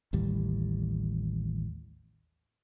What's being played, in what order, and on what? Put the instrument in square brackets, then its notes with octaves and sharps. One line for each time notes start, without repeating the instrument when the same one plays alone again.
[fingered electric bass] A1 D#2 A2 G3